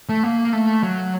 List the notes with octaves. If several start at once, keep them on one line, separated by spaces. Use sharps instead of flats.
A3
A#3
A3
F#3